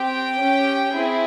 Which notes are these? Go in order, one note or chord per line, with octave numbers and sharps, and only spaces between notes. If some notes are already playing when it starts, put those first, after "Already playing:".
Already playing: C4 G4 G5
C#4 G4
C4 E4 G#4